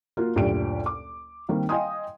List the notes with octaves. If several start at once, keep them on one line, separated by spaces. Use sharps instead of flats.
A#3 F4 F#4
F#1 D2 A#2 G4 D5 D7
D6
D#3 G3 A#3 C4
D#5 F5 G5 G#5 C6 D#6